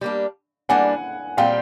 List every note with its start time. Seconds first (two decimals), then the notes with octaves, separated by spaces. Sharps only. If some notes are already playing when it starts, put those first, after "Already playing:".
0.01 G3 A#3 D4
0.69 G3 A#3 D4 F#5 G#5
1.37 A#2 G3 C4 F5 G5